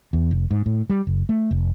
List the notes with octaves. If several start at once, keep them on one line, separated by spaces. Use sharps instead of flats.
E2
F1
G#2
A2
G3
F#1
A3
F1